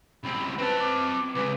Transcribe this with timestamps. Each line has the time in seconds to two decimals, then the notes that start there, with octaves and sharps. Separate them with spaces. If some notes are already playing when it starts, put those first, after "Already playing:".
0.24 C#2 C4 B5
0.58 C4 B4 A5
0.80 D6
1.35 C#3 G#3 B4